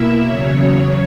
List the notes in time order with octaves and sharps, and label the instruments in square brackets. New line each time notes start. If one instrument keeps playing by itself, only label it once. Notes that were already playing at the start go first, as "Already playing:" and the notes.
Already playing: [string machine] B2 A#3 E4 E5
E2 C#3 F#3 C#5